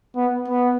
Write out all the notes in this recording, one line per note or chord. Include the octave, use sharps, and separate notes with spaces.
B3
B3